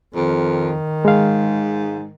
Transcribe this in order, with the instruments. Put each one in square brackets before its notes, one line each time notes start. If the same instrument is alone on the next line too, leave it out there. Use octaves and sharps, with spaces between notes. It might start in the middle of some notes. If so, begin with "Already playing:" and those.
[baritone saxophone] F2 [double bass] D#3
[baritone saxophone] G#2 [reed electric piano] G#3 F5